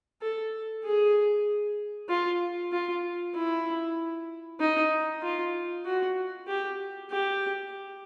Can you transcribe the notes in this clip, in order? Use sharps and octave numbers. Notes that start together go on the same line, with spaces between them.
A4
G#4
F4
F4
E4
D#4
F4
F#4
G4
G4